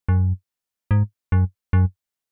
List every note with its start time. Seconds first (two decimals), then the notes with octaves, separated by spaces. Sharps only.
0.09 F#2
0.91 G#2
1.32 F#2
1.73 F#2